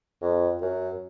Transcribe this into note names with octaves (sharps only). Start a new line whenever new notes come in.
F2
F#2